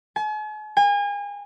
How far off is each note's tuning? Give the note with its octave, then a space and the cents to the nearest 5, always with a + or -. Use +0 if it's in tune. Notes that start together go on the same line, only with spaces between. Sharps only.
G#5 +45
G#5 -35